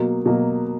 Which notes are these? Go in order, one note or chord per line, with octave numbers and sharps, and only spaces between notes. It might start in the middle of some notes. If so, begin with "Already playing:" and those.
Already playing: B2 F#3 A#3
B2 F#3 A#3